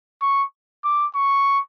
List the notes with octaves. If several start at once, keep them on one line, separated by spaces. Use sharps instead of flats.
C#6
D6
C#6